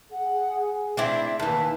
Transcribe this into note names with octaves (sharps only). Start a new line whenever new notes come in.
G#4 F#5
C4 D4 E4 E5
D#2 E3 A5